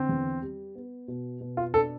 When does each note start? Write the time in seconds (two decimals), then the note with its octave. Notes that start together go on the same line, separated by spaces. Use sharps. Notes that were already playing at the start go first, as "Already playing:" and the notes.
Already playing: D3 C4
0.09 E2
0.42 G3
0.75 B3
1.08 B2
1.41 B2
1.57 F4
1.74 D4 A4